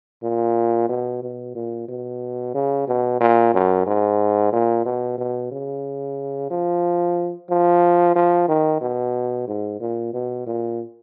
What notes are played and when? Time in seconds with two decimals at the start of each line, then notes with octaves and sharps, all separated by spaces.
0.23 A#2
0.89 B2
1.23 B2
1.55 A#2
1.88 B2
2.55 C#3
2.88 B2
3.21 A#2
3.54 F#2
3.87 G#2
4.53 A#2
4.86 B2
5.18 B2
5.52 C#3
6.51 F3
7.50 F3
8.16 F3
8.48 D#3
8.81 B2
9.48 G#2
9.80 A#2
10.14 B2
10.47 A#2